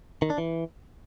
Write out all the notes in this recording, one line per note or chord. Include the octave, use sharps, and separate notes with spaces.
D#3
D4
E3